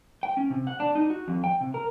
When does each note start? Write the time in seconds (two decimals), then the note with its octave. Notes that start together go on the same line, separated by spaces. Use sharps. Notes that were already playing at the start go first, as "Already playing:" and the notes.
0.23 G5
0.37 C#4
0.50 C3
0.67 F#5
0.80 D4
0.95 D#4
1.10 F#4
1.28 F2
1.44 G5
1.61 C3
1.74 A#4